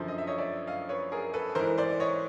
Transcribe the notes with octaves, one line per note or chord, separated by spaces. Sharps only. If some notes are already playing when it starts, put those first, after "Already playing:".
Already playing: F#2 D3 F3 C5
D#5
E5
C#5 D#5
D5 E5
D#5 F5
B4 C#5
G#4 A#4
A4 B4
G#2 E3 A#4 C5
C5 D5
C#5 D#5